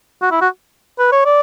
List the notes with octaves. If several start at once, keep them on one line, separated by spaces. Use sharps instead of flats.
F#4
E4
F#4
B4
C#5
D5